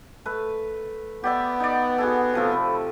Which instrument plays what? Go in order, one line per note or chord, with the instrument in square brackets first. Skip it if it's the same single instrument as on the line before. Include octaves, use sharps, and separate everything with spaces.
[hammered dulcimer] A3 B4
[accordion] B3 [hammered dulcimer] G4 D5 E5 [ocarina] F#5
[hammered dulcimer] D#4 D5
F#4 G#4 A4
C3 F3 A3
[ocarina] B5